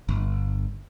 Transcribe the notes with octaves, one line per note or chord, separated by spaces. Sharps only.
G1